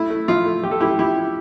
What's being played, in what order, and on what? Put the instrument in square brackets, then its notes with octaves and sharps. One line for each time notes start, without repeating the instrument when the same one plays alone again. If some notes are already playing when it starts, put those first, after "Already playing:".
Already playing: [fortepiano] A3 E4
A3
F3 F4
A3
F3 G4
A4
A3 E4 G4
F3 E4 G4
E4